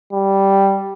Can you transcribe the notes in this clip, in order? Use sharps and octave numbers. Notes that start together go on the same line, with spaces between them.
G3